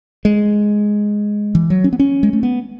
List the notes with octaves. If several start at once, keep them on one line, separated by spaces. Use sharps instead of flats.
G#3
E3
F#3
C#4
B3
C#4
G#3
A3
B3